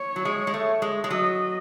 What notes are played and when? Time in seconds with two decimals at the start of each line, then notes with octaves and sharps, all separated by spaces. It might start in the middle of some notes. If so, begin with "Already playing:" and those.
Already playing: C#5
0.16 F#3
0.25 G#3
0.47 G#3
0.54 A3
0.82 G#3
1.04 G#3
1.11 F#3 D#5